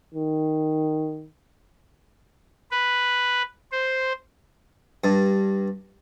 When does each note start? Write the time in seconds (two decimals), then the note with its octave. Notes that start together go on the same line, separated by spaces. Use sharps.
0.14 D#3
2.71 B4
3.72 C5
5.04 G2